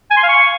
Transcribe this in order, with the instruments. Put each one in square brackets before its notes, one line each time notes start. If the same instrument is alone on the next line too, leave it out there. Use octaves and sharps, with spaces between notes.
[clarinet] G#5
C6
F5
C#6